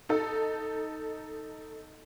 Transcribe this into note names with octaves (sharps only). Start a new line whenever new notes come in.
D#4 A4